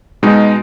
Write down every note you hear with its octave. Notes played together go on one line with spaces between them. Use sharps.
B2 G#3 D#4